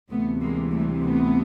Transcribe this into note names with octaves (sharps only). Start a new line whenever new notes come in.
D2 C3 E3 A3 B3
G#3 A#3
G3 A3
A3 B3